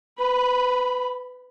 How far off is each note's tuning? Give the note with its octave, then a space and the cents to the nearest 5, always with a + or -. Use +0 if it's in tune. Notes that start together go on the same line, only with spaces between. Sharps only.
B4 +25 B5 -10